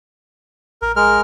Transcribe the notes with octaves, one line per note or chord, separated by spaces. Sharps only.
A#1 A#4
G#3 A#4 F6